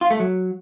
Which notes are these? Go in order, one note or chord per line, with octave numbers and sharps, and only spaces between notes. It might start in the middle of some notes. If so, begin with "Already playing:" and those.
F4
A3
F#3